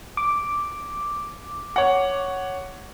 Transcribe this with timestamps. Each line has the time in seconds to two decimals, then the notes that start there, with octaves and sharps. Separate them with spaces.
0.17 D6
1.76 C#5 F#5